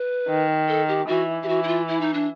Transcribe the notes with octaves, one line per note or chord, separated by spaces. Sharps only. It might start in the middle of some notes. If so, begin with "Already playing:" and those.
Already playing: B4
D#3
A4
G4
E3 F#4
G4
E3 F#4
E4
F4
E4
D#4
D4